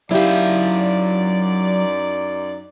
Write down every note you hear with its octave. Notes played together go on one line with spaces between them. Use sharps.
F#2 F#3 D#4 E4 G4 D5 F5